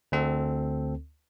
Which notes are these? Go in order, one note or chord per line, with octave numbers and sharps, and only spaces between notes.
D2 C4 A4